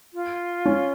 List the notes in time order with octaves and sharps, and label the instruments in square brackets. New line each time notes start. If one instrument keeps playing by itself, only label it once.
[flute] F4
[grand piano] C#4